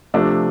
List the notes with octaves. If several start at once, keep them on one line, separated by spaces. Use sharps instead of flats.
C3 F3 A3 D4